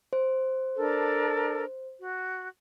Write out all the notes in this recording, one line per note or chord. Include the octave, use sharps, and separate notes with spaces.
C5
D4 A4 A#4
F#4